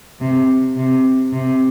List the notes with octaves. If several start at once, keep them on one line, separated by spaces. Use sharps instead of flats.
C3
C3
C3